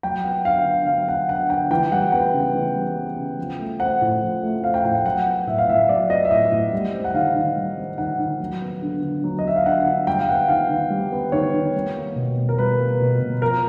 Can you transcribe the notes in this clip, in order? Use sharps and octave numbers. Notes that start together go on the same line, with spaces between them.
F#3 G5
B3 F#5
D3 F5
D3
F#3 F5
B3 F#5
D3 F#5
D3 G5
E3 G5
G3 F#5
B3 G5
C#3
E3
G3
B3
C#3
F3
A3
C4 F#5
A2
F3
A3
C4 F5
G5
A2 G5
F#5
F#3 F#5
B3
A2 E5
F5
A2 E5
F#3 D5
B3 D#5
E5
A2 D#5
A2
G3
C4
F#5
D#3 F5
D#3
G3
C4
D#3 F#5
D#3
F#3
B3
D3
D3
F#3
D#5
B3 E5
F5
D3 F#5
D3
G3 G5
F5
B3 F#5
D#3 F5
D#3
G3
B3
D#3 C#5
D#3
G3
A#3
B2
B2
A#4
G3 B4
A#3
B2
B2
F3 A#4